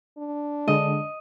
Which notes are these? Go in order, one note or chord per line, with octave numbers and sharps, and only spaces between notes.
D4
D3 G#3 D#5